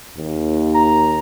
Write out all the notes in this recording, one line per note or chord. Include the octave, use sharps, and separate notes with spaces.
D#2
A#5